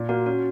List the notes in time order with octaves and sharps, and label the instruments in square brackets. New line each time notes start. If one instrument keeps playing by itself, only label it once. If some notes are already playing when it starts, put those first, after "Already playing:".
Already playing: [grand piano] A#2
[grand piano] A#3 [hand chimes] F#4
[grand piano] C#4 [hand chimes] F#4